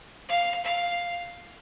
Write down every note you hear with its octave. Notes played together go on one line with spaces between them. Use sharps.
F5
F5